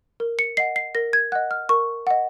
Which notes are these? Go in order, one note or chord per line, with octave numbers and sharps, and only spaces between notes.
A#4
C#7
D#5 F#5 C7
C7
A#4 A#6
G#6
D#5 F#5 F#6
F6
A#4 C#6
D#5 F#5